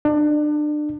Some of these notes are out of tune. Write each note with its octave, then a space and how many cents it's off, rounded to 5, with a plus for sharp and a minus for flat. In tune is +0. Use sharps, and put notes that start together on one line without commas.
D4 +30